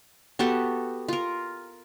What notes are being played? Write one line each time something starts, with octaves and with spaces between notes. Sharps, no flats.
B3 F#4 G4 A4
F4 A#4